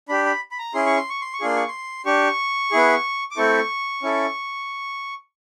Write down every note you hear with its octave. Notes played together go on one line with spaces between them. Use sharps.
D4 G4 B5
B5
B5
A#5
C#4 E4 G#4 C6
C#6
C6
C#6
C6
C#6
A#3 D4 F4 G#4 C6
C#6
C6
D4 G4 C#6
B3 E4 G#4
D6
A3 C4 E4 A4 C#6
C#4 E4 A4